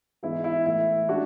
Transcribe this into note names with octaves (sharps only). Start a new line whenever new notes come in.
G#2 E3 G#3 B3 E4
E4
A2 E3 A3 E4
G#3 C#4 D4 F#4